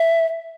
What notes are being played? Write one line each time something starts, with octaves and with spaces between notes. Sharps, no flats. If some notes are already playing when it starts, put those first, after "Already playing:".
Already playing: E5